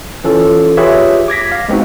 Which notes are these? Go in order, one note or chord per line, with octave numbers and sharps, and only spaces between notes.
E3 C#4 F4 A4
F4 G4 G#4 B4 C#5 E5
D6 G#6 A#6 B6
F5
G#3 B3 C4 D#4 F#4